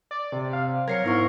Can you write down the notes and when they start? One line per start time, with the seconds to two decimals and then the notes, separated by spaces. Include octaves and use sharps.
0.11 D5
0.32 C3
0.53 F5
0.88 F#3 A#4 G#6 C7 C#7
1.04 G#2 B3 E4 C#6